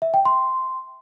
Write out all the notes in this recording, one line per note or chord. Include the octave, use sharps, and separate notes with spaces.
E5
G5
C6